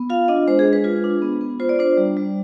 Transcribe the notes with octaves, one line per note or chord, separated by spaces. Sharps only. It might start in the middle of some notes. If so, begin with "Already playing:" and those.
Already playing: B3
F4 F5
D4 D#5
G#3 C5
G#4
G#3
B4
F4 B4
D4
B3
B3
F4 C5
D5
D4 C5
G3
G3